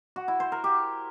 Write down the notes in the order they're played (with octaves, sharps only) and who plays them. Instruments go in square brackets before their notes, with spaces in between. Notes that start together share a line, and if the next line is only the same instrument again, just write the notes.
[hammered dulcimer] F#4
E4
C5
A#4
G4